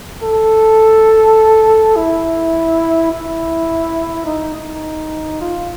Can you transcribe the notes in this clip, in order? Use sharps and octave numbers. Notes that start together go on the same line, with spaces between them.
A4
E4
E4
D#4
D#4
F4